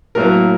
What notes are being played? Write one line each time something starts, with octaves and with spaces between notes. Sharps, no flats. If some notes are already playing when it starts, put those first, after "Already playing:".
A2 F#3 A#3 A#4